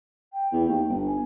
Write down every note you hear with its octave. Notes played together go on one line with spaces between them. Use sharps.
G5
E2
D#2
G1
G#5